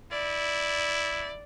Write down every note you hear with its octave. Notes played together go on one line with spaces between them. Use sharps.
E4 D5